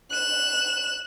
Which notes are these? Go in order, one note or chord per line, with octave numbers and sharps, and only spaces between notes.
F#6 E7